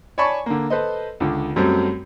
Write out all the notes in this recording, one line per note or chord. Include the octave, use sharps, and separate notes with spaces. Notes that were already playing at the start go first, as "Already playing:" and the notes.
C#5 D5 G#5 A5 B5 C#6
D3 A#3
A4 B4 C5 D#5
C#2 D3
F#2 F#3 G3 A3 C4